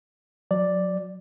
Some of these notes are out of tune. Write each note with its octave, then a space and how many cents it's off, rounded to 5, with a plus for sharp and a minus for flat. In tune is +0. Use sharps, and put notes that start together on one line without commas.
F#3 -25 D5 +0